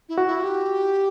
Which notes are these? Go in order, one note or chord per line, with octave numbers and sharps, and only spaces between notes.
E4
F#4
E4
G4